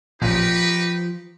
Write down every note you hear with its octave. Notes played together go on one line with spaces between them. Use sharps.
A1 A#2 F3 D#4 G4 B4